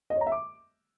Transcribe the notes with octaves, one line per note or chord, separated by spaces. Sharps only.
D#5
C#5
A#5
E5
D6